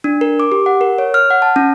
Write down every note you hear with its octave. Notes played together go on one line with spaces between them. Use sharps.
D4
A#4
D6
G4
F#5
A#4
C#5
F6
F#5
A5
C#4